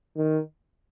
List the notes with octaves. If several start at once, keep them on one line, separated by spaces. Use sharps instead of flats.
D#3